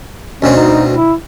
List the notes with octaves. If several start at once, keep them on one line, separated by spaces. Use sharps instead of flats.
D2 B2 C4 C#4
D#4
E4